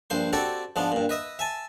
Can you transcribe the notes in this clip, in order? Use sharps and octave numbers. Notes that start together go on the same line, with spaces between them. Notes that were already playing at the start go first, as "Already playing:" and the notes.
A#1 G2 C5 C6
C4 F#4 G4 A4 D5
G#2 F3 B3 D4
G2 A#2
B4 D#5 E5
E5 G#5 A5